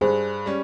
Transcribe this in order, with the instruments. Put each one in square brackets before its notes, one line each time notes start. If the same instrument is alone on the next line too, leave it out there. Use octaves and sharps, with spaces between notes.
[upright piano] G2 [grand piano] G#4 C5
[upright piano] G3 C#4